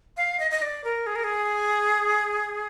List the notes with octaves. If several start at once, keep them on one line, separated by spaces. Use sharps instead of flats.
F5
D#5
D#5
D5
A#4
G#4
A#4
G#4